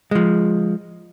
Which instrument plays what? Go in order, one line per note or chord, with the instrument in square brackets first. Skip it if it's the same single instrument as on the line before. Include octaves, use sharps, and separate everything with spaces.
[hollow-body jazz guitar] F3 G#3